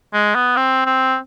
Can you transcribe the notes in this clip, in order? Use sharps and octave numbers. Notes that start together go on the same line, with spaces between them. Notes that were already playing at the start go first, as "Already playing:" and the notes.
G#3
B3
C4
C4